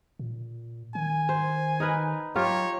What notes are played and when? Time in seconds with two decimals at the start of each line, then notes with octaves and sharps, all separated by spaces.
0.19 A#2
0.95 D#3 G#5
1.29 C5
1.80 D#4 A#4 B4
2.35 F#3 F4 G4 A#4 C#5